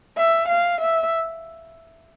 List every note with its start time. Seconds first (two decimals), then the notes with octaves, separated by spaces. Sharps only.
0.17 E5
0.48 F5
0.80 E5